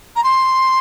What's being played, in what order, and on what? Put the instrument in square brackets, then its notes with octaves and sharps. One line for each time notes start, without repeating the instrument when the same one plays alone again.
[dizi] A#5
C6